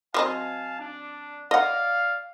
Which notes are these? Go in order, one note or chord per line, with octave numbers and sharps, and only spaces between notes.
F#3 C4 D#5 F5 G#5 A5
D4
D5 D#5 F5 F#5